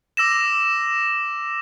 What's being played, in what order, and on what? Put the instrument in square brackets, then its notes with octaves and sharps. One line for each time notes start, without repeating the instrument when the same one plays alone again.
[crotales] D6 E6 A#6 E7